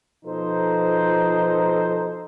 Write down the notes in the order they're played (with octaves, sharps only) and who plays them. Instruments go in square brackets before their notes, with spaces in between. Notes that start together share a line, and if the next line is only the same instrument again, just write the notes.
[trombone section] B2 F3 D#4 A4 C5